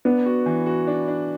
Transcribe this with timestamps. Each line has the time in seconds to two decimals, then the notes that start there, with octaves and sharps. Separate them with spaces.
0.05 B3 D4
0.26 F#4
0.46 E3
0.66 F#4
0.87 D4
1.08 D4